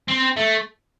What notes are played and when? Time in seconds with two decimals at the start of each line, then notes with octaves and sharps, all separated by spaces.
0.08 C4
0.37 A3